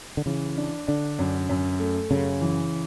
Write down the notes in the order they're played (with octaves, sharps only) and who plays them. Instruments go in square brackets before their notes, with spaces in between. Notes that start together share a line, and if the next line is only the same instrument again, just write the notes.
[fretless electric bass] D3
[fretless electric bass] C#3 [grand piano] E3
[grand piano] D4
[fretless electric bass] D3 [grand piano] D4
[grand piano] F#2
F#2
A3
[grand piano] F#2 [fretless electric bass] C#3
[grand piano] E3